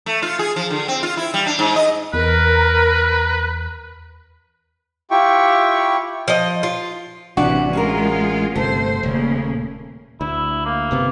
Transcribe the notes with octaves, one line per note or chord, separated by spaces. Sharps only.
A3
F4
G#4
F3
D3
C4
F4
E4
G3
D4
G#2
D#5
E2 A#4 B4
E4 F4 G4 E5 G5 C#6
F3 D#5
F4
A1 C3 E3 D4 F#4 D5
G#3 C#4 F4 G#4 A#4
G1 C3 A3 C5
D#1 C#3 A#3
D2 E4
A#3
G1 C3 B3